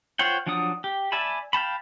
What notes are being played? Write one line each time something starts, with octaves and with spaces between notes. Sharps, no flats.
F4 C5 C#5 F#5 G5
F3 F#3 D4 F#5 D#6
G4
D5 E5 G#5 A5 B5
F5 G5 A5 B5